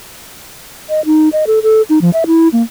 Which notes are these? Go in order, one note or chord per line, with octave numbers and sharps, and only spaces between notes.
D#5
D#4
D#5
A4
A4
D#4
F3
E5
E4
A#3